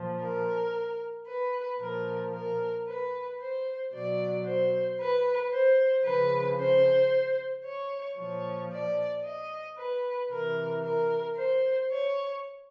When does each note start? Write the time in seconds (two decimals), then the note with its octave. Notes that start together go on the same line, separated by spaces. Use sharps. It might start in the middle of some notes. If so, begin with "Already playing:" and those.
Already playing: A#2 F3
0.21 A#4
1.27 B4
1.79 A#2 F3 A#4
2.33 A#4
2.85 B4
3.39 C5
3.93 B2 F#3 D5
4.45 C5
4.99 B4
5.51 C5
6.05 C#3 F3 B4
6.58 C5
7.64 C#5
8.17 A#2 F3 C#5
8.70 D5
9.24 D#5
9.77 B4
10.30 C3 E3 A#4
10.83 A#4
11.36 C5
11.90 C#5